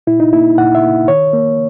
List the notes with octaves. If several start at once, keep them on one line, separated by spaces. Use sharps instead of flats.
A#2 E4
D#4
A#3 E4
A#2 F#5
E5
A#3
D#3 C#5
A#3